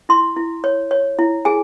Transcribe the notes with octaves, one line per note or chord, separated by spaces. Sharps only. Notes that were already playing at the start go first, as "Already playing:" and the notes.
E4 C6
E4
C#5
C#5
E4
G#4 G#5